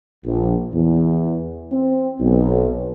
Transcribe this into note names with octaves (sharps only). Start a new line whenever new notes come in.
A#1
E2
C4
B1